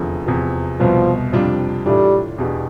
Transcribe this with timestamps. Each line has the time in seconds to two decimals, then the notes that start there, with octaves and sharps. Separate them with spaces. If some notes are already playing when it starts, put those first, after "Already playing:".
Already playing: F1 E2 D3 F3
0.27 E2 C3 F3
0.80 C2 B2 F3 B3
1.32 F2 C3 G3 D4 F4
1.86 A2 E3 G3 A3 D4 F4
2.38 E2 B2 B3 D4 G4